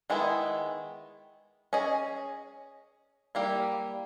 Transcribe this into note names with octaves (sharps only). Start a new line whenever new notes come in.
D#3 G#3 B3 E4
C#4 G#4 D#5
G3 A#3 E4